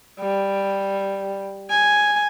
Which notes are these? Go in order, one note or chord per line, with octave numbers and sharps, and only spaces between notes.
G3
G#5